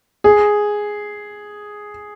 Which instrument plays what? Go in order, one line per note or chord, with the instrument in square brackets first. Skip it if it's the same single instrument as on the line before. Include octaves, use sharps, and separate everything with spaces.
[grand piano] G#4